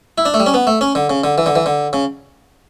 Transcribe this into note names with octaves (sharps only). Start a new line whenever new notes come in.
E4
D4
A3
G3
C#4
B3
A3
C#4
D3
C#3
D3
E3
D3
E3
D3
C#3